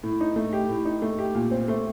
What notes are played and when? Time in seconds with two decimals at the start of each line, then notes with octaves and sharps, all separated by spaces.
0.03 A2
0.21 D#4
0.36 A3
0.53 G4
0.69 A2
0.85 D#4
1.02 A3
1.19 G4
1.35 A#2
1.51 C4
1.68 A3